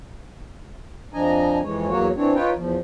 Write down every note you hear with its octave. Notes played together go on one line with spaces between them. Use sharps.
F2 F3 D4 D#5 G#5 A#5
F2 E3 G#3 C#5
E2 F#3 A#3 F#4 C#5
E3 C4 D4 C#5
D#4 F4 B4 C#5 G5
E2 F3